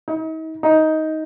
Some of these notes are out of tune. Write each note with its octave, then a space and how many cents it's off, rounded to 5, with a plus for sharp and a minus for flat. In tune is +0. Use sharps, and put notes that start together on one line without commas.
D#4 +45
D#4 +15